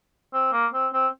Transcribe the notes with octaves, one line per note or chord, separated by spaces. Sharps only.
C4
A#3
C4
C4